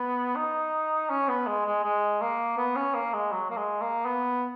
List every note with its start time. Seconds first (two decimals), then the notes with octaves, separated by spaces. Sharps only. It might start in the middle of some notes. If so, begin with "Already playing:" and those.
Already playing: B3
0.36 D#4
1.10 C#4
1.28 B3
1.47 G#3
1.65 G#3
1.83 G#3
2.21 A#3
2.57 B3
2.76 C#4
2.94 A#3
3.13 G#3
3.32 F#3
3.50 A#3
3.56 G#3
3.81 A#3
4.05 B3